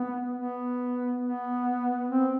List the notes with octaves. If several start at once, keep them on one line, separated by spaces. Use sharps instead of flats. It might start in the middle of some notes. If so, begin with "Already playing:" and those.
Already playing: B3
B3
B3
C4